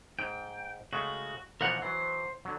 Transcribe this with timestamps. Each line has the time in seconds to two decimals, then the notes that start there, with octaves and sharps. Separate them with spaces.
0.19 G#2 G5
0.93 C#3 G#3 A3 F#4
1.61 B2 E3 F3 A#4 F#5
1.82 E3 F#3 C5
2.45 D3 F#3